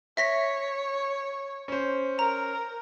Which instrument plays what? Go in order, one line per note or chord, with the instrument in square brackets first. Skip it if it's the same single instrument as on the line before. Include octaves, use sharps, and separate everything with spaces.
[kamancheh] C#5 [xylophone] E5 A#6 B6
[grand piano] C#4 C5
[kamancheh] A#4 [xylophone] A#5